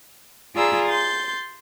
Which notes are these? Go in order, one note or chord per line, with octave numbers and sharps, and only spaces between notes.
F4 G#4 D5 A#5 B5 E6
C6 G6 A6